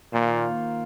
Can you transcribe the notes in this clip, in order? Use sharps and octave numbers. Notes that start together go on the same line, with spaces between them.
A#2 D#3 A#3 F4 C5